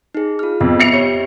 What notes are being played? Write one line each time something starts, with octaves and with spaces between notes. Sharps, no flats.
D#4 G#4
F4 F6
F2 B3
E5 C7 C#7 F7
G4 C#5